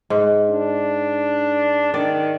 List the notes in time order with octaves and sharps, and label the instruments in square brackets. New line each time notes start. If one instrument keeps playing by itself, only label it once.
[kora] G#2
[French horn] D4
[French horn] D#3 [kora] D5